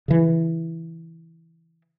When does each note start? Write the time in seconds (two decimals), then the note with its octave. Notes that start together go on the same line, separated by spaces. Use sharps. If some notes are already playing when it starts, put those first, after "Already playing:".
0.08 C#3 E3